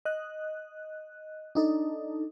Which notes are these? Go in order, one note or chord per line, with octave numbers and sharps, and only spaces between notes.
D#5 F#6
D4 D#4 A4